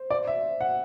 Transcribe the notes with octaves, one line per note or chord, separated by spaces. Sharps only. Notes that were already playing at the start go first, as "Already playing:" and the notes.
Already playing: C5
D5
E5
F#5